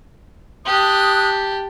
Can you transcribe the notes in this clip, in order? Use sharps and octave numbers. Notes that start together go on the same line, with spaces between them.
G4 A5 D#6 F#6